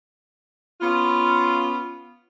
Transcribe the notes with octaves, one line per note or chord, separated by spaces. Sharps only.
B3 C#4 F4